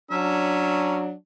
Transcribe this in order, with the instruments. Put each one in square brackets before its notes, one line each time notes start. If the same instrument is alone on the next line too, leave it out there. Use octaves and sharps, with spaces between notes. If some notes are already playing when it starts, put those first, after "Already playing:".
[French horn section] F#3 D4 [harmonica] C#4 E5 A#5